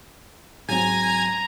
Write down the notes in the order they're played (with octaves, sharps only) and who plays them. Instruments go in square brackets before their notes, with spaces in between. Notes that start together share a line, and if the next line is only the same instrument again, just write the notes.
[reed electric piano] G#2 F#3 C4 [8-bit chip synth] G#5 G#6 [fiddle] A#5